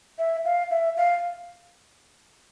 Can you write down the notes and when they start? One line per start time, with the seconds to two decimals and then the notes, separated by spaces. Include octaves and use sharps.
0.18 E5
0.45 F5
0.71 E5
0.97 F5